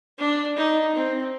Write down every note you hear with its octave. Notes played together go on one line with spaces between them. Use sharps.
D4
D#4
C4